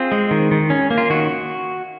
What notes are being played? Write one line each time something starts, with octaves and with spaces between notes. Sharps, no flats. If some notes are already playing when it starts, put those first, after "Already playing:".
Already playing: C4 F4 G#4
G#3
D#3
D#3
C#4
A#3
F4
D#3 F#4